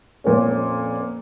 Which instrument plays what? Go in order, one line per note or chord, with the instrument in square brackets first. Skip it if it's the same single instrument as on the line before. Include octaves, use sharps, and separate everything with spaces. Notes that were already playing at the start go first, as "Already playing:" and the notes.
[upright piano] F2 A#2 B3 C#4